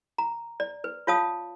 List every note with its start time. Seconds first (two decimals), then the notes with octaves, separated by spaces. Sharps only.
0.18 A#5
0.60 D5
0.84 B4
1.07 F4 C#5 F5 A5 D#6